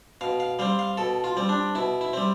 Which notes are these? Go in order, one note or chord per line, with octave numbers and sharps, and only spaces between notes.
B2 F5
F5
G3 C4 F5
F5
B2 A4
F4
G3 C4
D4
B2 E4
E4
G3 C4